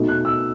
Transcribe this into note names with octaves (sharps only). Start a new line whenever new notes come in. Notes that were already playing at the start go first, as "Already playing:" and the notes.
Already playing: B2 A3 D#4
F#6
E6